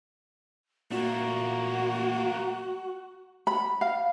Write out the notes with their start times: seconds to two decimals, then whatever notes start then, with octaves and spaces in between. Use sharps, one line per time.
0.91 A#2 A3 A#3 F#4
3.47 B5
3.81 F5